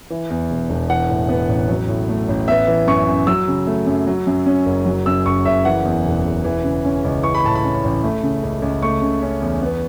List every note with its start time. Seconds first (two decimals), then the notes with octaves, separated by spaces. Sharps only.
0.10 E3
0.30 E2
0.51 E1
0.70 E1
0.89 E3 F#5
1.09 A2
1.29 B3
1.49 A1
1.69 F#3
1.88 A2
2.09 A3
2.28 A1
2.48 B3 E5
2.68 E3
2.87 F#2 C#6
3.08 F#2
3.27 F#3 E6
3.48 C#3
3.67 A3
3.86 F#2
4.07 F#3
4.27 F#2
4.46 C#4
4.66 F#1
4.86 F#3
5.06 F#2 E6
5.26 F#1 C#6
5.45 F#1 E5
5.65 E3 F#5
5.85 E2
6.05 E1
6.25 E1
6.44 E3
6.64 C#3
6.85 C#4
7.05 C#2
7.23 E3 C#6
7.35 B5
7.44 A2 A5
7.55 B5
7.64 C#4
7.84 A1
8.04 A3
8.23 C#3
8.43 C#2
8.62 C#2
8.82 A3 C#6
9.02 C#3
9.22 C#4
9.42 E2
9.62 B3